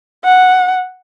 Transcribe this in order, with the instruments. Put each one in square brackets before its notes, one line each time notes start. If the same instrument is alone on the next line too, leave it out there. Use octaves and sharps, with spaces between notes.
[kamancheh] F#5